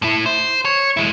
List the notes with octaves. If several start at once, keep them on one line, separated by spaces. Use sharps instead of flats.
A2 E4
C5
C#5
G#3 E4